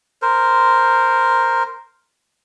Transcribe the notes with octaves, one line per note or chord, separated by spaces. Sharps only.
A#4 C5